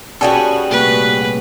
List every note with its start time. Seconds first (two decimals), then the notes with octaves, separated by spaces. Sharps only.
0.21 G3 B3 C#4 F#4 G#4 A4 G5
0.71 C2 A#2 A3 B4